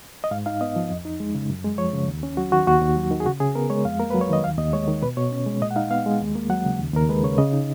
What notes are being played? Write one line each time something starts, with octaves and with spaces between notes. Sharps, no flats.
D#5
G#2 F5
D#4 F5
B3 D#5
F3
F2
D#4
G#3
C#3
F#2
G#3
F3 C#5
C#3
D#2
C#4
F#3 F#4
D#3 F#4
D#2 F#4
D#2
F#3
D#3
G#4
C#3 F#4
C#3 G#4
B3 A#4
G#3 C#5
F2 F5
A#3 A#4
F#3 B4
C#5
D#3 D#5
D#2 F5
D#2 D#5
G#3 C#5
D#3
B2 B4
B2 C#5
C#4
G#3
A#2 D#5
F#5
D#4 F5
B3 F5
G#3
D#2
A#3
F#3 F#5
C#3
D#2
D#2 A#4
G#3 B4
C#3 C#5
C#3 D#5
D#4